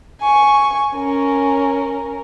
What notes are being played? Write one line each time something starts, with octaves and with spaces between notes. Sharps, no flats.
G#5 C#6
C#4 A#4